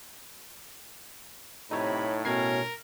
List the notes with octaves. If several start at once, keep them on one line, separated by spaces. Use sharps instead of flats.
A2 C3 D#4 A4 C#5 B5
B2 C#4 A#4 G#6 C7